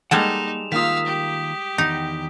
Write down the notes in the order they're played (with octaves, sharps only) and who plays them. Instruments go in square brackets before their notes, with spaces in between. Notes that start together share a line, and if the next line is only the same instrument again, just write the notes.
[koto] G3 G#3 A4 [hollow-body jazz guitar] A#3 F#5 [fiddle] D#4 [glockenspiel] E7 F7
[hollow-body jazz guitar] D#3 A#3 F4 [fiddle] F5 E6 [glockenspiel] D#6 B6
[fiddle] G4
[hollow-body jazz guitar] E2 D#3 [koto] D#4